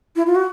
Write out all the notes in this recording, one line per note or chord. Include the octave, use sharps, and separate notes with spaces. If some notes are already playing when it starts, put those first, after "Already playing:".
E4
F4
F#4